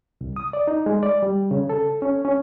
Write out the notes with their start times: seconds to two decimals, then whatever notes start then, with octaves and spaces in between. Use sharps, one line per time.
0.21 C2
0.36 D#6
0.53 D5
0.68 D#4
0.86 G#3
1.03 D5
1.23 G3
1.51 C#3
1.69 A4
2.02 C#4
2.25 C#4